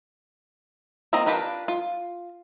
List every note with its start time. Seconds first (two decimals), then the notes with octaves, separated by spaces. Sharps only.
1.13 A#3 C4 A#4 D#5 A#5
1.26 D4 F4 G4 A#4 B4
1.68 F4